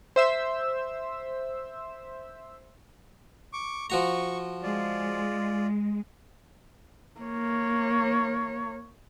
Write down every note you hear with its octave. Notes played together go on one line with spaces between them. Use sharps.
C5 E5 E6
C#6 D6
F3 F#4 A#5 C#6
G#3 F4 D5
A#3 C#5